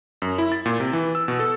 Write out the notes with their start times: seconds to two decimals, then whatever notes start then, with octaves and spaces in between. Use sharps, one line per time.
0.22 F#2
0.38 E4
0.52 A6
0.66 A#2
0.80 C3
0.93 E3
1.15 E6
1.28 B2
1.39 A4